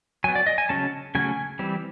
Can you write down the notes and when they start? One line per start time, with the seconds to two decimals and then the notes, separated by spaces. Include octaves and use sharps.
0.24 F#3 G#5
0.28 B3
0.35 D5
0.47 D#5
0.58 G#5
0.69 C#3 F#3 A3 C#4 A5
1.15 C#3 F#3 A3 C#4 G#5
1.59 E3 G3 C4